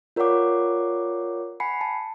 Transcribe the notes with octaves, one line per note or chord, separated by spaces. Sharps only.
F4 A#4 C#5 D5 F#5 D6
F#5 G#5 B5 C7 C#7
A5